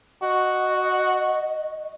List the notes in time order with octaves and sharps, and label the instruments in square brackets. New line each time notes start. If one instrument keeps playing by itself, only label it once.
[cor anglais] F#4 [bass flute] D#5